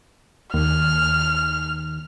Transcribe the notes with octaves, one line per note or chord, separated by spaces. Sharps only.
D#2 F6